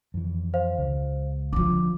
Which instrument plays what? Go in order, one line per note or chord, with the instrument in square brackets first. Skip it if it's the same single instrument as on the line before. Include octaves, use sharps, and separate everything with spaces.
[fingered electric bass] F2 E3
[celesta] C5 F5
[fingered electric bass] C#2
[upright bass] D3 F3 [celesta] D6